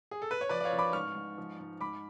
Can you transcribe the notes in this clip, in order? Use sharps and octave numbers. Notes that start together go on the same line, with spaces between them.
G#4
A4
B4
C#5
F3 B4 D5
D5
C#5 F5
F3
B5 D6
G#2 C#6 F6
G#2
F3
G#2
G#2 B5 D6